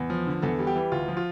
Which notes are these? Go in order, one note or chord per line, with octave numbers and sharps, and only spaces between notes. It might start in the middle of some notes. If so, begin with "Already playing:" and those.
Already playing: E2
F3
D3
E2 A4
G3
G4
E3
D2 F4
F3
F4